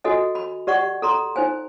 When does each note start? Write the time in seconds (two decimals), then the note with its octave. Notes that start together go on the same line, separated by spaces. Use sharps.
0.04 F#4 A4 D#5 G#5
0.35 B5
0.67 G4 D5 F#5 C#6
1.02 A4 A#5 C6
1.36 D#4 C5 G#5